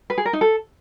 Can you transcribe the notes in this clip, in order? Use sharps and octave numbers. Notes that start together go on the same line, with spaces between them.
B4
G#4
A#4
D#4
A4